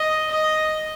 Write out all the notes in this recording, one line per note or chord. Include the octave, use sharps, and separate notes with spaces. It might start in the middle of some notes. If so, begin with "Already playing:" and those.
Already playing: D#5
D#5